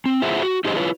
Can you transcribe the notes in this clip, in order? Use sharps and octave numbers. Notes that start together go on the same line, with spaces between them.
C4
E4 F4 G#4 C5 E5 F#5
F#4
D#4 G4 G#4 C5 D#5
E4 F4 B4 C#5